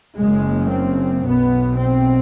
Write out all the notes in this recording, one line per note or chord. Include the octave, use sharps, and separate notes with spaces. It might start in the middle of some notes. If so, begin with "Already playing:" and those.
F#1 F#2 C#3 G#3
C4
B1 B2 B3
C4